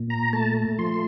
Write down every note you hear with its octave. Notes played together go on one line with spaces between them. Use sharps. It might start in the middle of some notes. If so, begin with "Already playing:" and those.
Already playing: A#2
A#5
A3 A5
F3 C6